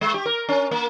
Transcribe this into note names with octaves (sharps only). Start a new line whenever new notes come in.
G#3
G4
A#4
C#4
A#3